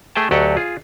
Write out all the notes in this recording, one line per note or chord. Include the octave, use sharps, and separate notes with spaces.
A3 G#4 E5 G5 A5
D2 F#3 G4 A4 D#5 F#5
F4 G#4